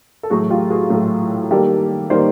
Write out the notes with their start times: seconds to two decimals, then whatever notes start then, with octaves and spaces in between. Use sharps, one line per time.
0.23 A4
0.30 A2 F#3 A3 F#4 G#4
0.50 F4 G4
0.70 F#4 G#4
0.90 A2 F#3 A3
1.51 D#3 G3 A#3 G4 A4
2.10 D#3 G3 A#3 C5 D5